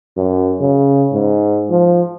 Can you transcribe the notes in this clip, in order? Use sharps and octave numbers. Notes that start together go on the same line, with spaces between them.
F#2
C#3
G#2
F3